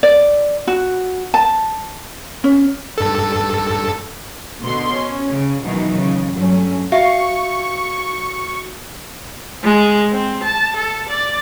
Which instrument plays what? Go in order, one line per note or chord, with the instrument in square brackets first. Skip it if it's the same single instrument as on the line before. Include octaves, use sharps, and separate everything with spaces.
[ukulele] D5
F#4
A5
C#4
[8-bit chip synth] G2 A4
[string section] B2 D3 C6
C#4
C#3
B2 D#3 E3 F#3
C#3
G2 F#3 A3 C#4
[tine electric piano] F#4 [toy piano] E5 [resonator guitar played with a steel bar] F5 [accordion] C#6
[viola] G#3
C4
A5
A4
D5